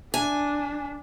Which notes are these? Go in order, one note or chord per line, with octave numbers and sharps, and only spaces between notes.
D4 G#5